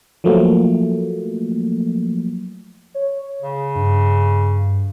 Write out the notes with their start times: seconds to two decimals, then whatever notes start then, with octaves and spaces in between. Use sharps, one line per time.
0.24 F3 F#3 A3 A#3
2.94 C#5
3.42 C#3
3.75 G2